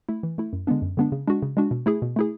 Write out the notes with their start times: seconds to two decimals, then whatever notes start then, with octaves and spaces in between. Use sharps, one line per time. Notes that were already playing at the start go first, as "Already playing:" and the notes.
0.09 A3 E4
0.23 E3
0.38 A3 E4
0.53 F#2
0.67 D3 G#3 B3 D4
0.82 F#2
0.97 D3 G#3 B3 D4
1.12 C#3
1.28 G#3 D4 F#4
1.42 C#3
1.57 G#3 D4 F#4
1.71 B2
1.86 A3 E4 G#4
2.02 B2
2.16 A3 E4 G#4